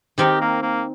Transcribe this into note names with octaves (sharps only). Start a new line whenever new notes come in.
D#3 C4 D#4 G4 A#4
A#3
A#3